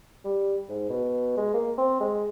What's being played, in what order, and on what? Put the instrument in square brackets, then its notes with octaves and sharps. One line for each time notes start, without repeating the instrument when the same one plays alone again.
[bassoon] G3
G#2
B2
G#3
A#3
C4
G#3